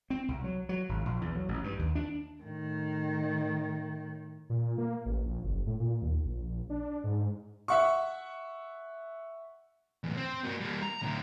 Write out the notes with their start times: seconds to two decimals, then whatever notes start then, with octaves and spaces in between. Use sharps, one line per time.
0.10 C4
0.28 C2
0.44 F#3
0.69 F#3
0.89 G#1
1.06 A#1
1.21 E2
1.35 F#3
1.49 A1
1.64 G2
1.79 D#2
1.95 D4
2.43 A2 D#3
4.50 A#2
4.78 A#3
5.06 A1
5.24 A#1
5.43 F#1
5.67 A2
5.80 A#2
6.02 D#2
6.24 A#1
6.70 D4
7.04 G#2
7.68 E5 F#5 C#6
10.04 E2 A2
10.17 C4
10.44 A#3 F#4
10.60 G3 A#3
10.82 A#5
11.03 A2 D3